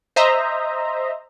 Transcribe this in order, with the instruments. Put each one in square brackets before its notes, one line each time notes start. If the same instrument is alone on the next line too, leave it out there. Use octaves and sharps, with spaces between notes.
[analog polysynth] C5 D#5 E5 A#5